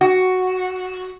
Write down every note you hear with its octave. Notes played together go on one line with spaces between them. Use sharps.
F#4